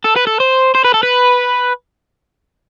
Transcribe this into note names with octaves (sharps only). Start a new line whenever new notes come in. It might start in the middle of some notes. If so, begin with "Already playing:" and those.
A4
B4
A4
C5
C5
B4
A4
B4